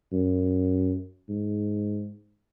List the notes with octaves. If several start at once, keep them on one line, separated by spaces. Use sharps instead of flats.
F#2
G#2